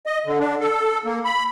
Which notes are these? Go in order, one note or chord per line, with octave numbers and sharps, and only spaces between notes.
D#5
D3
D4
A4
A#3
B5